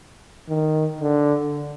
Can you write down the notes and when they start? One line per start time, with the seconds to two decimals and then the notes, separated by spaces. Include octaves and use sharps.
0.49 D#3
1.01 D3